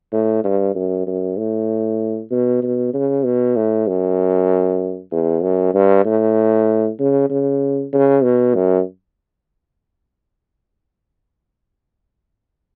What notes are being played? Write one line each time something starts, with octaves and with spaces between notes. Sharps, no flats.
A2
G2
F#2
F#2
A2
B2
B2
C#3
B2
A2
F#2
E2
F#2
G2
A2
C#3
C#3
C#3
B2
F#2